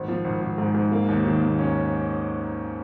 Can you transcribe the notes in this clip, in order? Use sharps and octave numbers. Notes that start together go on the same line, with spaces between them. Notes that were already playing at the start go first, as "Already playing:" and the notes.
Already playing: G#1
F3
G#1
G#1
G#2
G#2
A#3
D#2
D#3
D#2
C#4